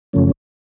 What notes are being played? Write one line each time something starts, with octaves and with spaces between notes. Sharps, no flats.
F#2 C#3 F3 A3 C#4